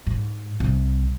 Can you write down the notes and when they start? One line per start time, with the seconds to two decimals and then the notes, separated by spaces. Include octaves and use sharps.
0.07 G#2
0.60 C2